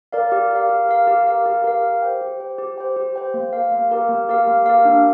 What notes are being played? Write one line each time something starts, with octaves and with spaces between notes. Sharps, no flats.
A#4 D5 F5
G4
A#4 F5
G4
A#4 F5
G4
A#4 F5
G4
A#4 F5
G4
C5 G5
G4
C5 G5
G4
C5 G5
G4
C5 G5
A#3
G4 A#4 F5
A#3
G4 A#4 F5
A#3
G4 A#4 F5
A#3
G4 A#4 F5
D4